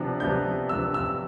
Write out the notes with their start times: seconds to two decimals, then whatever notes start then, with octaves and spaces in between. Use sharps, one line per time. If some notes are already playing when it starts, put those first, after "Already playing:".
Already playing: C3 F3 B3 D4
0.20 C3 F3 B3 D4 G6
0.69 C3 F3 B3 D4 E6
0.94 E6